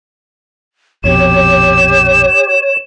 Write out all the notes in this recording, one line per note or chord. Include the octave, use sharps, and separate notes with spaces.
A#1 F2 B2 G4 C#5 E7